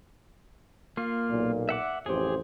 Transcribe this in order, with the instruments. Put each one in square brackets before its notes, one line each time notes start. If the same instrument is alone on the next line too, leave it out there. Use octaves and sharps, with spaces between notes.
[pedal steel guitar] A#3 F4
[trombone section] B1 A#2
[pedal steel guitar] E5 F#5 D6
[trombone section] A1 F2 C5 [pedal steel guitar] G4 G#4